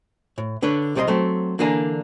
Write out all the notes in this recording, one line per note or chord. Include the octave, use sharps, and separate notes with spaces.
A2
D3 D4 B4 C#5
C2 C3 G3 A4 D#5 C6
F#3 A3 C4
D3 E3 A#3 D4 G#5 A#5